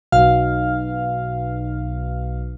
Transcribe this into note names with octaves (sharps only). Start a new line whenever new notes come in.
B1 F5